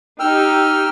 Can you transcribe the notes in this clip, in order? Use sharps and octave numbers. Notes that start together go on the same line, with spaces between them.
D#4 G4 G5 E6 F6